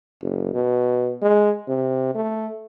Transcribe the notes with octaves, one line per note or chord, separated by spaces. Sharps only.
F#1
B2
G#3
C3
A3